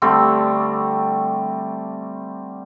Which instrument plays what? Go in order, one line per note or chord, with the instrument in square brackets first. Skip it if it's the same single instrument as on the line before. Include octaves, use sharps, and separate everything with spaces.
[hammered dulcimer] D3 G3 A3 C4